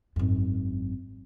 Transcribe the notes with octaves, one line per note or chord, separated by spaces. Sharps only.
G#1 F#2